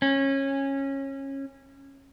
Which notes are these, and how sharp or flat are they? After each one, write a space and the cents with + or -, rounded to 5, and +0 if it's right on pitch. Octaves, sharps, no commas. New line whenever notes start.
C#4 -20